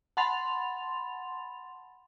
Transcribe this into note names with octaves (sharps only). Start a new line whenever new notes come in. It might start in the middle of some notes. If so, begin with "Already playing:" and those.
F#5 A5 B5 C6 A6 F7